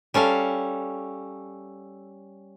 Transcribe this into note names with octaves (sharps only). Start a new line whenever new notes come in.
G3 C#4 A4 F5